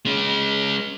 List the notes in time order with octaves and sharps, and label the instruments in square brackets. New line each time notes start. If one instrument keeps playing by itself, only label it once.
[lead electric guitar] G#3 C#4